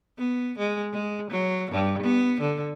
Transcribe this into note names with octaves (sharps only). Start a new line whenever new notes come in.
B3
G#3
G#3
F#3
G2
B3
D3